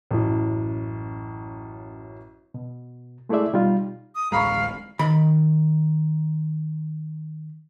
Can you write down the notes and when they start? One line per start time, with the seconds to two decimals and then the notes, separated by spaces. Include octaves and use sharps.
0.11 A1 F#2 E4
2.54 B2
3.29 G#3 A3 E4 G#4 D5 E5
3.53 B2 G3 D#4 F4
4.15 D#6
4.32 D1 A1 G#3 F5 A#5 B5 C#6
4.99 D#3 B5